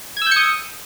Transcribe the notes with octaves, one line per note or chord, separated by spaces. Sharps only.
D#6 E6 G6 G#6 C#7